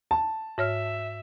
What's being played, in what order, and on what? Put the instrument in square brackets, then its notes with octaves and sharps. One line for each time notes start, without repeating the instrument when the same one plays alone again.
[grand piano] A5
[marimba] G#2 C#5 F6 [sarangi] E5